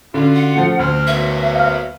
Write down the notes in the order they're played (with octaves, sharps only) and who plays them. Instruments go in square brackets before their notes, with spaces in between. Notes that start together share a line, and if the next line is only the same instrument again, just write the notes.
[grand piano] D3 [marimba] C#4 [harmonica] F4 F#4
[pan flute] F#5
[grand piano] F3 A3
[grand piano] D2 [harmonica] C4 F6
[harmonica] F#3 A#3 B3 [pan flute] E5
[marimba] F5 F6